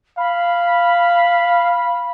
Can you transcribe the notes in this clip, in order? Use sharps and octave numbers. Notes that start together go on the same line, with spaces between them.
F5 B5